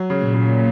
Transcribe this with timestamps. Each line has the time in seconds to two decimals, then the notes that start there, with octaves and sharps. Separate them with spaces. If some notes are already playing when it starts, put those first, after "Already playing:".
Already playing: F#3
0.10 C#3
0.22 A#2
0.34 C#3